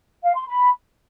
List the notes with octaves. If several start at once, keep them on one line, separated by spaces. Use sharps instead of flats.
F5
C6
B5